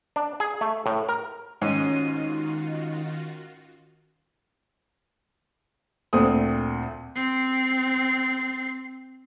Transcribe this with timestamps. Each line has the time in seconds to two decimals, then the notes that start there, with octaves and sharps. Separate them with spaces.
0.16 D4
0.40 G#4
0.61 A3
0.86 A2
1.09 A#4
1.62 G#2 D#3 C#4 D#4 F4 F#4 D#7
6.13 D2 A#2 C4 D#6
7.16 C4 C7